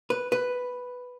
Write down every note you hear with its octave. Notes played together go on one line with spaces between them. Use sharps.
B4
B4